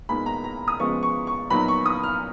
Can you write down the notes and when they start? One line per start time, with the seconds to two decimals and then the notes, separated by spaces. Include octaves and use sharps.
0.09 A#2 G#3 B3 D#4 B5
0.26 A#5
0.44 A#5
0.68 D#6
0.80 C#3 F3 G#3 B3 C#6
1.03 C#6
1.27 C#6
1.50 A#2 F#3 B3 D#4 B5
1.68 C#6
1.86 D#6
2.03 F6